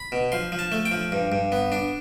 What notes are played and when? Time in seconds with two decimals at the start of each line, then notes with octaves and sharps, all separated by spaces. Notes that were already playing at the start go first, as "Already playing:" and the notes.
Already playing: B5
0.12 B2
0.32 F3 C6
0.52 F3
0.59 A5
0.72 A3
0.85 G5
0.92 F3
1.12 G2
1.32 G2
1.52 B3
1.72 D4